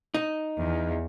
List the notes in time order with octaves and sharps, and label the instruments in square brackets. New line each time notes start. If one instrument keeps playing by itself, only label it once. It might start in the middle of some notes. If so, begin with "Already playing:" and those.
[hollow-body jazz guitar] D#4
[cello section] E2